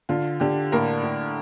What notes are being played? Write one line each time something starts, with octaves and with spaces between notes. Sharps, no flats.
D3 F4
D3 G4
A2 A#3 A#4
A2